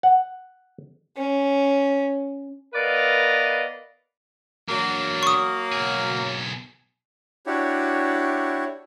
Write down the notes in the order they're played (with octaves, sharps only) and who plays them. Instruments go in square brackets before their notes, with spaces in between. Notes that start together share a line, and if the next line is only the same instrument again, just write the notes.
[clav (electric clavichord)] F#5
[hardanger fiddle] C#4
[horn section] B3 A#4 B4 D5 D#5 F5
[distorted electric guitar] E2 D4 [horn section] F#3 A#3
[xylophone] C#6 D#6
[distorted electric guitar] B1 G#4
[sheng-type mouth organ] D4 E4 F#4 G4 C#5